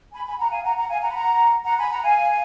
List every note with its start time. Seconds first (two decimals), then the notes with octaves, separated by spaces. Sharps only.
0.12 G#5 B5
0.25 G#5 B5
0.38 F#5 A#5
0.51 F5 G#5
0.63 F#5 A#5
0.76 F#5 A#5
0.89 F5 G#5
1.01 F#5 A#5
1.10 B5
1.15 F#5 A#5
1.65 F#5 A#5
1.78 G#5 B5
1.91 F#5 A#5
2.03 F5 G#5